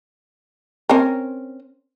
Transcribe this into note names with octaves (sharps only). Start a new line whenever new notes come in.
C4 C#4 A#4